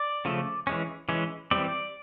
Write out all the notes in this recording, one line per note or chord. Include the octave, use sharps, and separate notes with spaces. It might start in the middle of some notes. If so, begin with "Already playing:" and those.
Already playing: D5
C#3 F3 A3
E3 G#3 C#4
E3 G#3 C#4
E3 G3 C4 D5